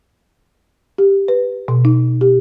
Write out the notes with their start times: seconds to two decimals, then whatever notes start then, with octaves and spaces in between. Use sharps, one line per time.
0.98 G4
1.28 B4
1.68 B2
1.85 D#4
2.21 G4